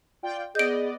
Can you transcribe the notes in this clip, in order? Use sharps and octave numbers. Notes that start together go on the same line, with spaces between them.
F4 D5 G5
B3 G#4 D5 D#5 G6 D7